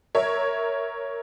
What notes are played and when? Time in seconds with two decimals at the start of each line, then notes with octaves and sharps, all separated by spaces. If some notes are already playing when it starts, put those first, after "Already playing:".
0.15 A#4 C#5 E5